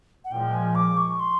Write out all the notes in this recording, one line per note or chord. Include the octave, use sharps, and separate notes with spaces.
F#5
A#2 F3 G#3 G5
G#5
D6
C#6
C6